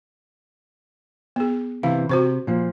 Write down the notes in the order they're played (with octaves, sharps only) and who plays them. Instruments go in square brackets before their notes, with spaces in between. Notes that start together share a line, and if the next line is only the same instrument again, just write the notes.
[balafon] B3 G#4
[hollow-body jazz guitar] C3 E3 [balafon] F5
[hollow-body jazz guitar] C3 [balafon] F#4 C5 C#6
[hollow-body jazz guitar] A#2 F3